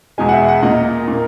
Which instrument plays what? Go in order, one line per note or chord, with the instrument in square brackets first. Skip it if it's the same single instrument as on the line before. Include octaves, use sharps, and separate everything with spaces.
[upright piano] E2 B2 G#3 G#5
F#5
E5
F#5
A#2 A#3 D#5
A#2 A#3